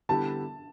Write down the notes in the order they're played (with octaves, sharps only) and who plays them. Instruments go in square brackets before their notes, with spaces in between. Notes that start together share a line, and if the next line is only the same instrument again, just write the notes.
[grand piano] D3 G3 B3 E4 G4 [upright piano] A5